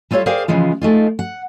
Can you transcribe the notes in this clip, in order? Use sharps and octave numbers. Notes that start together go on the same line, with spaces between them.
G3 F4 A4 C#5 E5 F5
G#4 A#4 C5 D5 F5 G5
C#3 E3 F3 G#3 F4
G#3 A3 D#4 F4
F#5